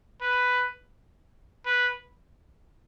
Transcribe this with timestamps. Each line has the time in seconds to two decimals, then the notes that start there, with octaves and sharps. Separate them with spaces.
0.21 B4
1.65 B4